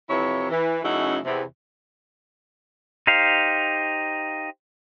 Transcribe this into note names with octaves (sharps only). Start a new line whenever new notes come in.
F2 C3 E3 E4 C#5
E3
F#2 C#3 A3 D#4 E4 F#4
E2 C3
D#4 G4 C5 F5